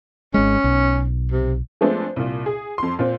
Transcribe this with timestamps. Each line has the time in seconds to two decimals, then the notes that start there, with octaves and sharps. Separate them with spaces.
0.34 G#1 G#3 C#4
0.64 B1
1.32 C3
1.81 F3 G#3 A3 B3 C4 D4
2.16 C2 A#2
2.46 G#4
2.78 F2 C6
2.99 A#2 C4